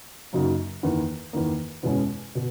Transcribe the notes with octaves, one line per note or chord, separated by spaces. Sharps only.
F#2 C#3 F#3 A#3 D#4
E2 D#3 A#3
E2 D#3 A#3
E2 B2 G#3 C#4
B2